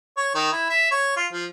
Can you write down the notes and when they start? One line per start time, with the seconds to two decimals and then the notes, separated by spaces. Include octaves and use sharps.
0.17 C#5
0.35 D#3
0.52 E4
0.70 E5
0.91 C#5
1.16 F4
1.32 F3